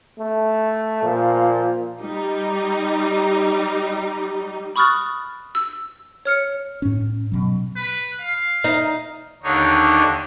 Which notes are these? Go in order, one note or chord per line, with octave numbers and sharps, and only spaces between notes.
A3
A#2 F3
G3 D#4
B5 C#6 D#6 F6 F#6 A6
E6
C#5 F6 C#7
A2 C#4
B2 F#3
B4
F5
D#4
D#2 D3 D4 D#4 C#5